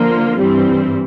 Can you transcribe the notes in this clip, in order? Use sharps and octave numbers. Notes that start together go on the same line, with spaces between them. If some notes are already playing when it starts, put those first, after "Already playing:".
Already playing: D3 F3 A#3 F4
G2 E3 G3 C4